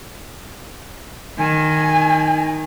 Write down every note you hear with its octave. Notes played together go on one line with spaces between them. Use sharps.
D#3 G#5